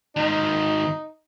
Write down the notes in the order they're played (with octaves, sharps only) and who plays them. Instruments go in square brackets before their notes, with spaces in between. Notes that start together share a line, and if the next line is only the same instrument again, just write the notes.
[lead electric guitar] G#2 D#3 [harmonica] D#4